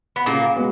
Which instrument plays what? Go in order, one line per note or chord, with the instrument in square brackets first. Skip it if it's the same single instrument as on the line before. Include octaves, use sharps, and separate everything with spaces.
[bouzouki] B3
[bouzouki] A#2 A#3 [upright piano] C#3
[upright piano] G#3 B3 F#4